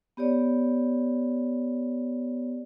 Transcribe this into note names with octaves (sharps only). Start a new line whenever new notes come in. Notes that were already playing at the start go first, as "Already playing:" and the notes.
B3 G4 C#5 D5